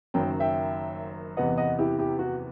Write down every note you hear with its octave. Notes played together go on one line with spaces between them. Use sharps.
F#1 F#2 D#3 F#3 G5
E5 G5
E2 C3 E3 B3 D#5 F#5
D#5 F#5
E4 G4
E4 G4
F#4